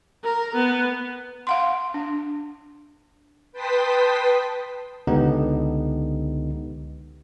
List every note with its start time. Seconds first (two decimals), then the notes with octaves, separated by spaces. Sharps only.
0.23 A#4
0.55 B3
1.47 F5 F#5 C6
1.94 D4
3.52 B4 G5 A5 C6 D#6 B6
5.07 C#2 D3 B3 D#4 G4